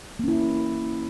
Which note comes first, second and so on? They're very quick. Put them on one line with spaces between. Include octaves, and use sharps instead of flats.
A#3 C#4 E4